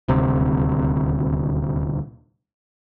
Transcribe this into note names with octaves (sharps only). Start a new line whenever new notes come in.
D#1 D2 C3